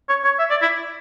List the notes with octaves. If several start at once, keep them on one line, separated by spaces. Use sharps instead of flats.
C#5
C#5
E5
D5
E4